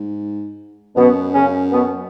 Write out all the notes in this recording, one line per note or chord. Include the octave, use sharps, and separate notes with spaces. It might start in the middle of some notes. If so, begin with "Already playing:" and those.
Already playing: G#2
F#2 B2 B3
C#3 C#4
B2 B3